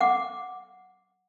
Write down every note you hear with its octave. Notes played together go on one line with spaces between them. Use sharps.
F#5 D6